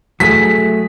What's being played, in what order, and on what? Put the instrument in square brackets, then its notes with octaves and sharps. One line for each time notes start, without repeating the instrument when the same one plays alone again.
[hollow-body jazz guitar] F#3 A3 G#4 [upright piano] B6